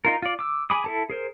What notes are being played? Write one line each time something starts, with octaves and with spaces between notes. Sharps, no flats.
D#4 F4 A#4
F4 D5
D6 E6
G#4 G#5 B5 D6 D#6
E4 A4 A5
G#4 A#4 C5